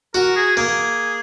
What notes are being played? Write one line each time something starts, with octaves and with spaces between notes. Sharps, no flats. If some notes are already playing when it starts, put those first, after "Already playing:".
F#4 A#4
G#4
A#3 G#4